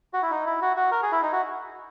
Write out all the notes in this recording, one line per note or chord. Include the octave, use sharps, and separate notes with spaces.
F#4
E4
D#4
E4
F#4
F#4
A#4
G#4
E4
D#4
F#4